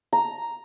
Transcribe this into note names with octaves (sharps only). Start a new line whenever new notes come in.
A#5